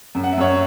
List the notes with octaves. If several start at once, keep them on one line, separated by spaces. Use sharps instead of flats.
F#2
F#5
E5
F#2 C#5 F#5